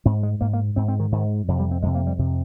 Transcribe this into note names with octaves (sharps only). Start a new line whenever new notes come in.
G#2 C4
G#3
G#2 A#3
A#3
G#2 C4
C4
D#3
G#2 D#3
F2 C3
G3
C4
F2 C3 G#3
A#3
G3
F2 C3